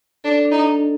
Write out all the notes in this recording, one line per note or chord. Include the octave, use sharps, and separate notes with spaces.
D4 A4
D4
D#4
D4